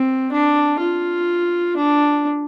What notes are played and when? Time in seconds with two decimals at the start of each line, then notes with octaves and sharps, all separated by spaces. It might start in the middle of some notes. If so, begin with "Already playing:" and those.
Already playing: C4
0.32 D4
0.80 F4
1.77 D4